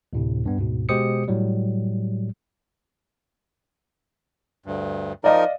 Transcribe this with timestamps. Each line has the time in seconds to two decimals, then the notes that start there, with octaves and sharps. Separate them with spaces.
0.13 D2 A2 C3
0.46 G2 B3
0.57 D2 G#2 B2
0.89 B2 G#3 G4 C5 D#6 C#7
1.28 A2 F#3 G3
4.66 D2 G2
5.24 F3 D#4 A#4 D5 D#5 F5